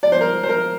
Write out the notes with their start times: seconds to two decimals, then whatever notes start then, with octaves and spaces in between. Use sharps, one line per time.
0.03 D5
0.12 C5
0.21 A#4
0.43 C5
0.49 A#4